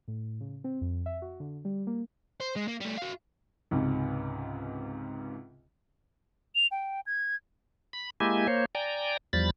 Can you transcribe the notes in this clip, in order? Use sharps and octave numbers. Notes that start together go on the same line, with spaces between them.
A2
C#3
C4
F2
E5
F#4
D3
G3
A#3
C5
G#3
A#3
G3 A3
F#4 F5
C#2 G#2 C3
F7
G5
G#6
B5
G#3 A#3 E4 G4 G#5
A#3 C5 C#5
D5 G5 G#5 A#5
E2 F3 G3 B5 A6